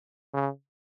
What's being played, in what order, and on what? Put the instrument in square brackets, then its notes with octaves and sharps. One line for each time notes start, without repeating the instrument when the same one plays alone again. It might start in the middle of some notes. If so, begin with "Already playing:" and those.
[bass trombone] C#3